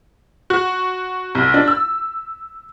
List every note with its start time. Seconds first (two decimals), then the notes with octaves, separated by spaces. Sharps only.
0.50 F#4
1.35 C2
1.54 D4
1.68 E6